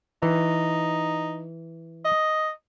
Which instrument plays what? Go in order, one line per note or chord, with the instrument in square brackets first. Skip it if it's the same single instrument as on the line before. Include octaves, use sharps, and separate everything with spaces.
[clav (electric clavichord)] E3 [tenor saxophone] D#4
[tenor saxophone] D#5